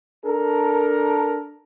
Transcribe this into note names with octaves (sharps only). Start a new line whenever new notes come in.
D4 A4 A#4